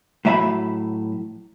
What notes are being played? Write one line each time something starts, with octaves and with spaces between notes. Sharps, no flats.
A2 F#3 E5 A5 B5